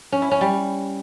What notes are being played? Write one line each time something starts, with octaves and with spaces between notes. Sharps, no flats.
C#4
E4
C#4
G3